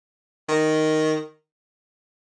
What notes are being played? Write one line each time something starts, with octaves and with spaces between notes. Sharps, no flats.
D#3